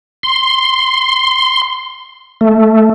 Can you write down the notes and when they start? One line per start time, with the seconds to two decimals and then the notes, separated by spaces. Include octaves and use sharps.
0.23 C6
2.41 A3